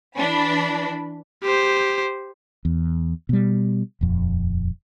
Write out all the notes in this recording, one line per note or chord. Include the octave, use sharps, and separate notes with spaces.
E3 D4 B5
G4 C5
E2
B2 G3
D#1 F2